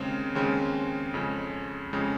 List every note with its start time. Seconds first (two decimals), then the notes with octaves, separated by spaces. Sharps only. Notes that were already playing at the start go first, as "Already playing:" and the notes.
Already playing: D#2 C#3 G#3 C4
0.35 D#2 C#3 G#3 C4
1.14 F2 C#3 G#3
1.93 F2 C#3 G#3